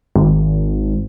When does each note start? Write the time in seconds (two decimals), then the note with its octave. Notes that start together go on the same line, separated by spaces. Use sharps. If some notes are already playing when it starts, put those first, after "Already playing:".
0.16 G#1